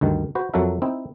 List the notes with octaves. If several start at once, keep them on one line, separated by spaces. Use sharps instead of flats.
D2 G2 D#3
F#4 B4 C5
F2 F#3 F#4 A4 A#4 E5
C4 D#4 E4